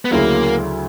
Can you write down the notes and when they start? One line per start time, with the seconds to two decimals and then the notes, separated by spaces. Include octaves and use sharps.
0.05 B3
0.12 D2 C#3 F#3 A#3 C#4 E4